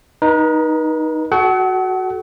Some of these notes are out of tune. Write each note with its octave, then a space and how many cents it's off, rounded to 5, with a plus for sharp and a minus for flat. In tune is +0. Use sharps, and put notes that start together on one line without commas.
D#4 +0 B4 -40
F#4 +0 A4 -40 F#5 +30